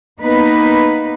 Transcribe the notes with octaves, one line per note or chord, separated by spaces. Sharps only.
A#3 B3 D#4 B4